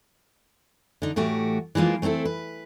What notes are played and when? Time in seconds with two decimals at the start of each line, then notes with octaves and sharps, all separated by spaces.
1.02 D3 D#4
1.16 A2 E3 A3 F#4 G4
1.75 E3 F3 G#3 A#3 F4
2.02 A3 C4 D#4 E4 A4
2.25 B4